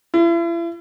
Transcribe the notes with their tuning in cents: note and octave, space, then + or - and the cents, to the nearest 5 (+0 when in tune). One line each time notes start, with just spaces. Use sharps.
E4 +40